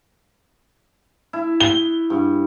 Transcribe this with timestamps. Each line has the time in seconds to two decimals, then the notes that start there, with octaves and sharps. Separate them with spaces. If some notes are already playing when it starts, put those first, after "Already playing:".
1.33 E4
1.60 G7
2.10 G2